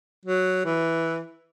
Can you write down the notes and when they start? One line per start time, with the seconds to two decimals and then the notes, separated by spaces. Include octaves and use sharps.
0.25 F#3
0.65 E3